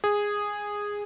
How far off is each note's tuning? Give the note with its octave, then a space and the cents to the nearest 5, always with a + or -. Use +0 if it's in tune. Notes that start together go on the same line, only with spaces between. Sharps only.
G#4 -10